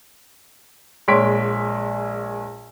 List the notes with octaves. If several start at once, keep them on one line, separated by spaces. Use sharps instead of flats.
A#1 G#3 C#5 C6 B6 D7